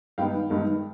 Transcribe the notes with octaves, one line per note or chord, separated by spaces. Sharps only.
G2 D#3 G#3 B3 D#4 F5 G5
G2 D#3 G#3 B3 D#4